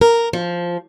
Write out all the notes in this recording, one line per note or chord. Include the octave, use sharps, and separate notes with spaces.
A#4
F3